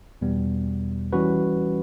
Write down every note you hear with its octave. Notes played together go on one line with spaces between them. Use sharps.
E2 B2 G3 B3
E3 G3 C#4 F#4 B4